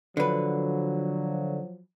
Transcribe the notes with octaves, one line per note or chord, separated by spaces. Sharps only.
D3 F3 F#3 B4